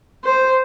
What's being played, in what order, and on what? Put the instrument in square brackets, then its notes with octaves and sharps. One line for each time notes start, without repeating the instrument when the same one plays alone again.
[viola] C5